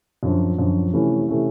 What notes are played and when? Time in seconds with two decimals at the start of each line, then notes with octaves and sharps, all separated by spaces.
0.23 F#2 D3 F3
0.58 F#2 D3 F3
0.93 C3 E3 A3 C#4 E4
1.29 C3 E3 A3 C#4 E4